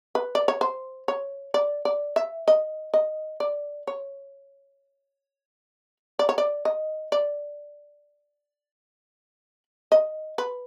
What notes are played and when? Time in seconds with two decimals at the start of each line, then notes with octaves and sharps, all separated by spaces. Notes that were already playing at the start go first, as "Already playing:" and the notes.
0.15 B4
0.35 D5
0.48 C#5
0.61 C5
1.08 C#5
1.54 D5
1.85 D5
2.16 E5
2.48 D#5
2.94 D#5
3.40 D5
3.87 C#5
6.19 D5
6.29 C#5
6.38 D5
6.65 D#5
7.12 D5
9.92 D#5
10.38 B4